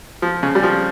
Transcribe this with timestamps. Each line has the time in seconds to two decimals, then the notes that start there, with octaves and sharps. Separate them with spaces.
0.22 F3
0.43 C#3
0.55 G3
0.63 F3